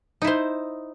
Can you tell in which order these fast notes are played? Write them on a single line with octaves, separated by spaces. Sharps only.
D#4 E4 C5